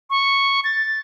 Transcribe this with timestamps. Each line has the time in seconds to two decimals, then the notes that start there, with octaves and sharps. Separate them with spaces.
0.10 C#6
0.64 A6